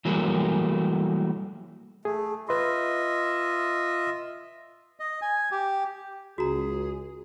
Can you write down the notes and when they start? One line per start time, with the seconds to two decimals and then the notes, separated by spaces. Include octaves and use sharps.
0.05 E3 F#3 G3 A3 A#3 G#4
2.05 A3 G#4
2.49 F4 B4 D#5 E5 C6
5.00 D#5
5.22 G#5
5.52 G4
6.38 C#2 F#4 G#4 A#5